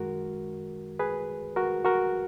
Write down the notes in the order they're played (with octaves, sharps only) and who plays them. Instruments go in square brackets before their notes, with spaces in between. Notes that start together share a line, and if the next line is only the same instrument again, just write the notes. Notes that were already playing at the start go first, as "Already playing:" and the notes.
Already playing: [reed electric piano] F#2 D#3 G#3 F#4 A#4
G#4 B4
F#4 A#4
F#4 A#4